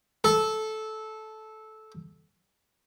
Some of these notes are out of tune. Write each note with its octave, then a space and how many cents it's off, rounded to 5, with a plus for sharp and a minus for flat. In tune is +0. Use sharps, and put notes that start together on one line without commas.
A4 -15